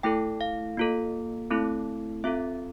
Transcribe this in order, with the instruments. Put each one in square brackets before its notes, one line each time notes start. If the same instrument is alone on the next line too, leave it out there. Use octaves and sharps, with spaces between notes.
[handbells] A3 E4 A4 G5
F5
A#3 F4 A4
A3 C4 E4 A4
C4 F4 A4 E5